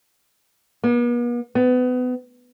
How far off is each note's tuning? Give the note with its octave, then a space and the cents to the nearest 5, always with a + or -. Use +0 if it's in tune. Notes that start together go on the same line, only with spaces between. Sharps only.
B3 -45
B3 +25